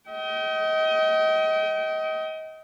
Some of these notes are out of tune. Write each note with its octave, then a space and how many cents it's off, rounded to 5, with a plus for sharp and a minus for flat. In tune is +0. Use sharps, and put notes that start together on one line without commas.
D#5 +25 G5 -30